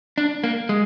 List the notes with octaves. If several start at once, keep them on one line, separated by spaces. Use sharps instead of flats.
D4
A#3
G#3